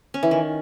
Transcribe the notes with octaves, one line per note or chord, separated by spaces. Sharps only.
C#4
E3
D#3